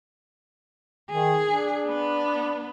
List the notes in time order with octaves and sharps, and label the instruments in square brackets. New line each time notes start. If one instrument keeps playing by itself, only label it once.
[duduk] D#3 [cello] G#4
[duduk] D4
[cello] B3